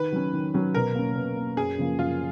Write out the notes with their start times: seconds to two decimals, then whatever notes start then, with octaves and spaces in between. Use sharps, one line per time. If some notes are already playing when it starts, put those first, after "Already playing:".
Already playing: D#3 B4
0.12 F#3 C#4
0.33 D#3
0.54 F#3 C#4
0.75 B2 A#4
0.95 A#3 C#4
1.15 B2
1.36 A#3 C#4
1.57 F#2 G#4
1.78 C#3 F3 A#3
1.99 F#2 F4